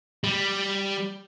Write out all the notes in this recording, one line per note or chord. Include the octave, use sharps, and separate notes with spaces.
G3